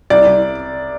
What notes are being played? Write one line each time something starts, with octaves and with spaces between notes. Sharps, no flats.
C2 D5
C2